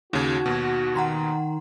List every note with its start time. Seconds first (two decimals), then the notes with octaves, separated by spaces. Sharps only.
0.13 D#2 C#3 D#4 F#4 G#6
0.46 D#2 B2
0.95 D#3 F#5 A#5 C6